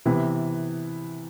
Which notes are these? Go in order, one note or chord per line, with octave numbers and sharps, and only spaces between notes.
C3 E3 B3